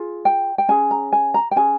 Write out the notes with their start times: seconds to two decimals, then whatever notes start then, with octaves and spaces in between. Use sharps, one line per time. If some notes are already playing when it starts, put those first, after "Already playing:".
Already playing: F4 G#4
0.25 G5
0.58 G5
0.69 C#4 G#4 G#5
0.91 A#5
1.13 G#5
1.34 A#5
1.51 G5
1.56 C#4 G#4 G#5